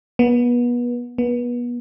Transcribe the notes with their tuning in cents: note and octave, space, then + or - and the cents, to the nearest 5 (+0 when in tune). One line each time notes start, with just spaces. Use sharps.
B3 -30
B3 -30